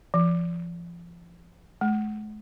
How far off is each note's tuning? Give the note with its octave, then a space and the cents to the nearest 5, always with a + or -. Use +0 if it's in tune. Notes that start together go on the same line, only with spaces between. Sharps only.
F3 -30
G#3 +45